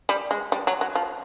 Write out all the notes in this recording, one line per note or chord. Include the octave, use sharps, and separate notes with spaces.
G3
G#3
G3
F#3
F#3
F3